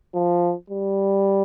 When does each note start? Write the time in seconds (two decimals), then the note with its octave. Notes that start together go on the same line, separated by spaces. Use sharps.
0.15 F3
0.70 G3